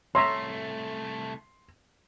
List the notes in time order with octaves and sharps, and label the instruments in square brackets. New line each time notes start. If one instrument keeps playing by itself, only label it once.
[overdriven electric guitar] C2 A3 [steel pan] C#5 E5 A#5 [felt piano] C6